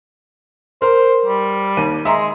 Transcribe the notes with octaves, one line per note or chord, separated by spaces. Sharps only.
A#4 C5
G3
D#2 D#7
G#3 E5 A#5 C6